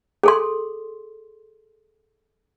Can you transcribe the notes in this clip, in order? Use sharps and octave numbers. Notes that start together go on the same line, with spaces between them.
G#4 A4 C6